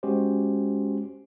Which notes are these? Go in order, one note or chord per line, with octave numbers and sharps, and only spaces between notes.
G#3 C#4 F#4 G4 C5